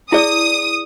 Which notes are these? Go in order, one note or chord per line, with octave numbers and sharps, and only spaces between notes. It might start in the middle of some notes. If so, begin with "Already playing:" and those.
E4 G#4 D5 D#6